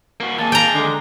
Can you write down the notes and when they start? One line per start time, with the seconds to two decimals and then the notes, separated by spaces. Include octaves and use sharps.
0.20 A#3 F#4
0.38 D#2 A#3 G#4 A5
0.52 G5 A#5
0.73 D3 G#3 D4